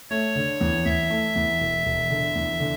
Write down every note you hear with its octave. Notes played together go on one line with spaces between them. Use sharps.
A3 C#5
D3
E2
E2 E5
A3
E2
E1
E1
D3
E2
D3